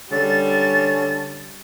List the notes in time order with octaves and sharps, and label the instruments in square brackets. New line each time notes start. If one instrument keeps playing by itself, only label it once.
[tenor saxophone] D3 [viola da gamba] G3 [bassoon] C#4 [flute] A6